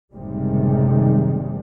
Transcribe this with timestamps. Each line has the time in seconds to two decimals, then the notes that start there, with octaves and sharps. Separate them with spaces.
0.13 F#1 A2 C3 D#3 G3 G#3